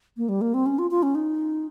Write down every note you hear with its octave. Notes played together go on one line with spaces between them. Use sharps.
A#3
G3
A#3
C4
C#4
F4
F4
C#4
D#4